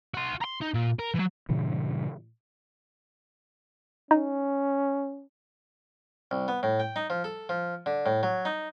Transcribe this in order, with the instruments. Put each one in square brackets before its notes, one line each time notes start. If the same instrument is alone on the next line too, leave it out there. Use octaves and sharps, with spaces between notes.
[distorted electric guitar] F#4 C6
A#5 C6
D#4
A#2
A#4
E3 F#3
[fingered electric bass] G2 A#2 C#3 E3
[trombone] C#4 [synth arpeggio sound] D#4
[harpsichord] C2
B3
A2
G5
D#4
F3
A4
F3
D3
A2
F#3
D#4